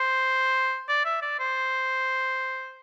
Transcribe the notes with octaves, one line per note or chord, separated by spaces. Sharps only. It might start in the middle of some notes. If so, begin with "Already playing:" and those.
Already playing: C5
D5
E5
D5
C5